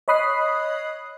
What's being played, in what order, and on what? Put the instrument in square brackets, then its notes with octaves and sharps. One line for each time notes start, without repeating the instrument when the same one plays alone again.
[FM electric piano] C#5 D#5 B5 D#6 F#6 C7